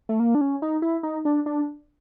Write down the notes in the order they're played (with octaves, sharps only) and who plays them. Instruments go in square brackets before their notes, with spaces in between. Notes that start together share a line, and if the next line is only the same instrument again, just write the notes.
[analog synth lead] A3
A#3
D4
C#4
D#4
E4
D#4
D4
D4